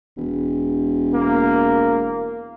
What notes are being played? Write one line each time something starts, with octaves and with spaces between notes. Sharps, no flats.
E1
A#3